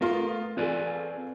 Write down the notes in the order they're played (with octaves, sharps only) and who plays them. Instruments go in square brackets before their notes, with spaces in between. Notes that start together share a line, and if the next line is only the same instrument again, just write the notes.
[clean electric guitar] A3 A#4 [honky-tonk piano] B3 F4 C6
[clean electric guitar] C4 B4 D5 [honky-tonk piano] F4 G#4 A4